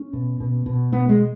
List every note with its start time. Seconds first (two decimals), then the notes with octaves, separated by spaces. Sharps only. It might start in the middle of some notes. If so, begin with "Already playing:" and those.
Already playing: C#4
0.13 B2
0.40 B2
0.66 B2
0.92 B2 B3
1.09 G#3